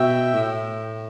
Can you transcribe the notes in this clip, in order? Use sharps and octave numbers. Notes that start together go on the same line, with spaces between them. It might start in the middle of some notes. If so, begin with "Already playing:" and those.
Already playing: B2 E5 G5
A2